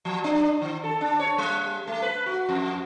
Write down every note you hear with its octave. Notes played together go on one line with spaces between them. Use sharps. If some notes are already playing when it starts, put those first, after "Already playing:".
F3
D4
D#3
A4
D4
C#5
G3
A3
B4
F#4
F2